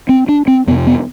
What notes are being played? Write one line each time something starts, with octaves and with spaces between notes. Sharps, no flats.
C4
D4
C4
F2 C3 B3
B3